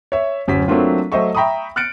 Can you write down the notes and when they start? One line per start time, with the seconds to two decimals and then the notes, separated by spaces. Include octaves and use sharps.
0.12 C#5 E5
0.48 D1 F#2 C#4 B6
0.68 F#3 A3 A#3 C4 D4 F4
1.12 F#3 A3 C5 D#5 E5 C#6
1.35 E5 G5 A#5 B5 C#6 D#6
1.76 F6 F#6 A6 C#7 D7